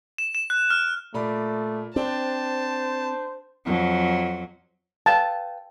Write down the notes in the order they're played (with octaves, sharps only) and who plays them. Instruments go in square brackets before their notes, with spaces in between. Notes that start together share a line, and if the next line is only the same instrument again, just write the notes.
[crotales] E7
E7
F#6
F6
[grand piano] A#2 D5 B5 [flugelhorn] A3
[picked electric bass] C4 [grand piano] D4 G5 [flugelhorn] C5 [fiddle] A5
[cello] F2 F#3
[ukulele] B4 F5 G5 [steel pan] A5